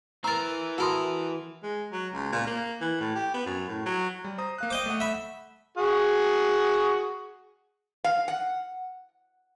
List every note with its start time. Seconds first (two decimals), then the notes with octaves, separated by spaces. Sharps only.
0.24 E3 A#4 C5 A#5 E6 A6
0.78 F#4 A4 A#4 F#5 B5 C6 D#6
1.63 G#3
1.92 F#3
2.13 C#2
2.32 A#2
2.47 A#3
2.81 E3
3.00 A2
3.15 G4
3.34 B3
3.46 F#2
3.68 A2
3.86 F#3
4.24 G3
4.38 C5 A#5 D#6
4.58 A#3 F5 F#6
4.70 C5 D#5 G5 D6 G6
4.86 A3 F#5
5.00 E5 B5
5.78 F#4 G#4
8.04 F5
8.28 F#5